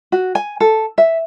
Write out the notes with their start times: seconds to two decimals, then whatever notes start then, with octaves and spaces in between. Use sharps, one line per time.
0.12 F#4
0.35 G#5
0.60 A4
0.98 E5